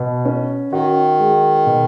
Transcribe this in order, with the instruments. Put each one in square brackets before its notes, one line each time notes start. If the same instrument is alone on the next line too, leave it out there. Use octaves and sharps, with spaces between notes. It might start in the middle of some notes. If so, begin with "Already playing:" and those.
Already playing: [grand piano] B2
C#4
[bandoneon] D#3 [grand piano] F#4
[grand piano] G#3
B2